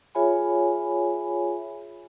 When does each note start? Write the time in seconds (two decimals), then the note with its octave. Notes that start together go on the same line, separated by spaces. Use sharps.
0.15 F4 G#4 C#5 E5 G#5 B5